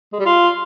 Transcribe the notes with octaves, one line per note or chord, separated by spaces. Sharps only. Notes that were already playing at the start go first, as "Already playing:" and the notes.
G#3
G3
F4